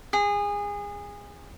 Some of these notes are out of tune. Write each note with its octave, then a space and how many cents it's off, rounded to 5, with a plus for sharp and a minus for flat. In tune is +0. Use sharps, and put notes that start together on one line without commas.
G#4 -25